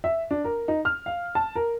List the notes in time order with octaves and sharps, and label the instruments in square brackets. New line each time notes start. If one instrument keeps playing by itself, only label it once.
[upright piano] E5
D4
A#4
D#4
F6
F5
A5
A#4